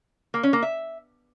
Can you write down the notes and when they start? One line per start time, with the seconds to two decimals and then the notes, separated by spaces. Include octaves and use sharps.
0.34 A#3
0.43 C#4
0.53 A#3
0.63 E5